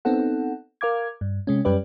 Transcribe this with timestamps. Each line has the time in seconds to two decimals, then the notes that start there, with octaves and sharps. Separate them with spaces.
0.05 B3 C4 D#4 A4 F#5
0.81 A#4 F5 D6 G#6
1.21 G2
1.47 C3 G#3 C#4
1.65 F#2 G3 C#4 G4 B4 D5